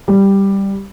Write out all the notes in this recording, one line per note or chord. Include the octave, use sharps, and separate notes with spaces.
G3